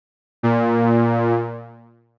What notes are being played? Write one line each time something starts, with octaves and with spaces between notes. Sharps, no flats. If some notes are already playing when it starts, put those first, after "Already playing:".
A#2